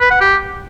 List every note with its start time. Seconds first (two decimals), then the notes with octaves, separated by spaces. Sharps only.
0.01 B4
0.11 F#5
0.21 G4